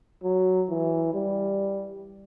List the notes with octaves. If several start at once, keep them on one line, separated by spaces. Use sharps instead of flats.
F#3
E3
G3